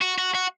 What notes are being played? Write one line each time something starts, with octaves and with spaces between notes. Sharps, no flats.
F#4
F#4
F#4